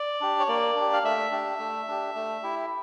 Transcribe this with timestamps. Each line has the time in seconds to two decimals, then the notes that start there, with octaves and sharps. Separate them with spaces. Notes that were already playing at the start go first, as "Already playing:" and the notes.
Already playing: D5
0.21 D4 G4
0.39 C#5
0.48 A#3 D5
0.76 D4 G4
0.93 F5
1.04 A3 E5
1.32 D4 G4
1.59 A3
1.88 D4 G4
2.15 A3
2.43 E4 G4